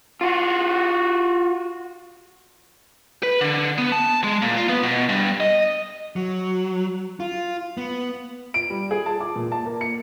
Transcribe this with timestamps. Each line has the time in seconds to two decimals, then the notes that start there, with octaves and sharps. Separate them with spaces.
0.21 F4 F#4
3.23 B4
3.41 D3
3.78 B3
3.92 A5
4.24 G#3
4.42 A#2
4.57 F4
4.69 B3
4.83 B2
5.09 G2
5.40 D#5
6.16 F#3
7.20 F4
7.77 B3
8.54 D7
8.70 G3
8.91 G#4
9.06 A5
9.20 D6
9.36 A#2
9.52 A5
9.66 A#3
9.81 C#7